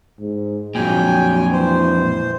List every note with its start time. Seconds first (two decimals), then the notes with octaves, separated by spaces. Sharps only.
0.20 G#2
0.75 F2 A#2 F#3 G5 G#5
1.52 E3 C5